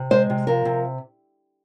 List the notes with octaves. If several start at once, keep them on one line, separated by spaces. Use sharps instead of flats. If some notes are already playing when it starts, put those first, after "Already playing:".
Already playing: C3
G#3 C5
C3
F3 A#4
C3